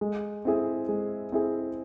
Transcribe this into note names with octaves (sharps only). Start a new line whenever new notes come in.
G#3
C4 E4 G#4
G#3
C4 E4 G#4